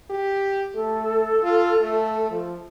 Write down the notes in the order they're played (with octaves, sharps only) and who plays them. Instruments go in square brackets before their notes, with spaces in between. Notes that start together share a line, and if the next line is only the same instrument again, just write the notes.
[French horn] G4
[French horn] A3 [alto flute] A4
[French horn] F4
A3
F3